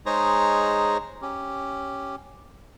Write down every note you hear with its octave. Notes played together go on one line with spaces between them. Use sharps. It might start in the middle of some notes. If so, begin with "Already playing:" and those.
G#3 D#4 G#4 C5 C#5 A#5
C#4 G4